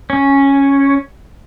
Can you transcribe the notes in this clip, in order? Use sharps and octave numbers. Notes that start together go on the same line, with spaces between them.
C#4